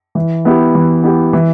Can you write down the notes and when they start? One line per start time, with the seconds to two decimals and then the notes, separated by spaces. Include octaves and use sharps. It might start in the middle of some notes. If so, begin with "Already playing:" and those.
0.15 E3
0.45 B3 E4 G4
0.75 E3
1.04 B3 E4 G4
1.33 E3